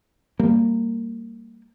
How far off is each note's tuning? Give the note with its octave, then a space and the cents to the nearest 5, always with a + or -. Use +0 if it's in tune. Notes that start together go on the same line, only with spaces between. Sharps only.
G3 +0 A#3 -20